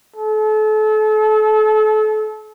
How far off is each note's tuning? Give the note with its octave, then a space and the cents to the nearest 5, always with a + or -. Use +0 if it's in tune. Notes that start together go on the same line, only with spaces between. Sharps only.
A4 -35